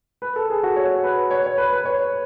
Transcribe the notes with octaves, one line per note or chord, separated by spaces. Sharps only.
B4
A4
G#4
F#4
C#5
B4
C#5
C#5
B4
B4
C#5